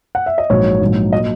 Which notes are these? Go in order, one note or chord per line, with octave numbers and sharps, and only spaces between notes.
F#5
E5
D#5
A#1 G#2 F#3 C#5
A#1 G#2 F#3
A#2 F#3 D#5